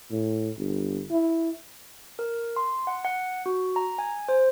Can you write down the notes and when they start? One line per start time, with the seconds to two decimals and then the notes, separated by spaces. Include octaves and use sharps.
0.11 A2
0.58 G1
1.11 E4
2.19 A#4
2.56 C6
2.87 F#5
3.05 F#5
3.46 F#4
3.76 A#5
3.98 G#5
4.29 C5